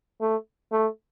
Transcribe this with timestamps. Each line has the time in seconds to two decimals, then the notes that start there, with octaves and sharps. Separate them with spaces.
0.21 A3
0.72 A3